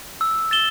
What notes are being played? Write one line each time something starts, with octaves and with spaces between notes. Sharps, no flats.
E6
A6 E7 G7